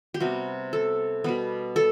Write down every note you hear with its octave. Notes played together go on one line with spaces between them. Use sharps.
G4
C3 G3 B3 F#4
A4
B2 G3 B3
A4